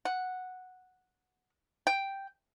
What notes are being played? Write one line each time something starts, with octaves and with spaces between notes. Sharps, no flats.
F#5
G5